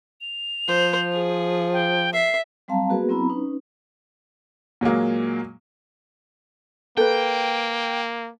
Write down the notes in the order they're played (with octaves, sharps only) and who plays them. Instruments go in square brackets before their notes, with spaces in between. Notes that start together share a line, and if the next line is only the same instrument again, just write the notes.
[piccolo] F7
[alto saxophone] F3 [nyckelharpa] C5
[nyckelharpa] G#4
[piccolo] G5
[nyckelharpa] E5 [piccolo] C7
[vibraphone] F#3 G3 C4 F5 A5 A#5
A#3 B3 F#4 G#4 A#4 B4
F#3 B3 C4 E4 A#5 B5
C#4 D#4 B4
[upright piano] A#2 F#3 G#3 A#3
[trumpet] A#3 [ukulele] A4 B4 [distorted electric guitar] G5